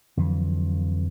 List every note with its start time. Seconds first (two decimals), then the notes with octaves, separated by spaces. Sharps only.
0.17 F2 D3 E3 F#3